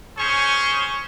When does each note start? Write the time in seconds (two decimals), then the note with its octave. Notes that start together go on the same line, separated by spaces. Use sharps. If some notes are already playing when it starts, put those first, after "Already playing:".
0.17 C#4 G#4 C5 C#5 C#6